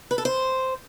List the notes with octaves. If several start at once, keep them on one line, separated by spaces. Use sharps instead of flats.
B4
A4
C5